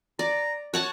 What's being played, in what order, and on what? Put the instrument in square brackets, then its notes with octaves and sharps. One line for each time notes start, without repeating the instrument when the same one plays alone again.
[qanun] D5 [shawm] A#5
[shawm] F#4 [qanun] C#5 F#5 A5